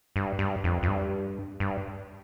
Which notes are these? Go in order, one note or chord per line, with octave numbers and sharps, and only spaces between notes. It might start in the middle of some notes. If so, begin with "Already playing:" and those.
G2
G2
F2
F2
G2
G2